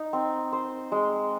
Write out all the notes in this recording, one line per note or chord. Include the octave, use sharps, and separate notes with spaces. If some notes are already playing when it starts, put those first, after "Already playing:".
Already playing: D#4
C4
C5
G#3